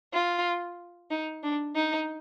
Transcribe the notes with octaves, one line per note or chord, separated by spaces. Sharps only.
F4
D#4
D4
D#4